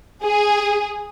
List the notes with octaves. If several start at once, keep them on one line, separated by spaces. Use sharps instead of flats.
G#4